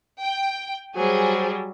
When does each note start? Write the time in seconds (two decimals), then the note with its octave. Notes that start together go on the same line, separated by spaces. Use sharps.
0.20 G5
0.96 F#3 G3 G#4 C5